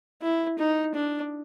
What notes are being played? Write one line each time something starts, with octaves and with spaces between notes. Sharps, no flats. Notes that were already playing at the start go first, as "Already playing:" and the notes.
E4
D#4
D4